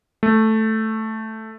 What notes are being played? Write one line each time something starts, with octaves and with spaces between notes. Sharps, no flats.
A3